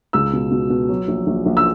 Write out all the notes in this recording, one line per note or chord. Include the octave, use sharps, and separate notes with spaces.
C#2 E6
B2
B2
B2
F#3
A#1
A#1
A#1
E6